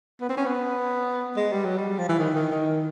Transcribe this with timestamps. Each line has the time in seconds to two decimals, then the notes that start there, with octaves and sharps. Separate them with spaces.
0.21 B3
0.29 C4
0.37 C#4
0.46 B3
1.36 G#3
1.52 G3
1.64 F#3
1.78 G3
1.98 F3
2.08 E3
2.19 D#3
2.35 D#3
2.52 D#3